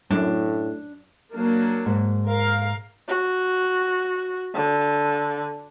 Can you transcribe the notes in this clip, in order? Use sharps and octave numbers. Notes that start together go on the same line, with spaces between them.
F#2 A2 D4
F#3 A#3 D4
G#2
A#4 F5
F#4
D3